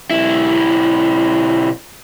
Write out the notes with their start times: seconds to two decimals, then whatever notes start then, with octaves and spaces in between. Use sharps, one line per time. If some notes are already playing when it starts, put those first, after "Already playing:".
0.11 B1 E4